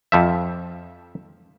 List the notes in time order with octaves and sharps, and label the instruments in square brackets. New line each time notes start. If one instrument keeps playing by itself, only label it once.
[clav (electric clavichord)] F2 F3 E5